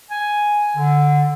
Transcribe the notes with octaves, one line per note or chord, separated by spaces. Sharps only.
G#5
D3